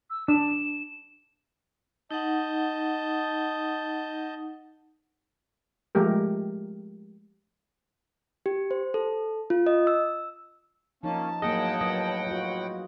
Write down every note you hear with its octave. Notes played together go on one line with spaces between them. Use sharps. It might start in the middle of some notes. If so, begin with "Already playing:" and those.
E6
D4 E7
D#4 D#5 F#5 A5 G6
F3 G#3 A3 G4 A#4
G4
C5
A4
F4
D#5
E6
F3 A#3 C#4 D#4 A5
A2 F#3 A#3 G#4 D#5 F#5 G5
F#3 B4 D#5
F4 F#4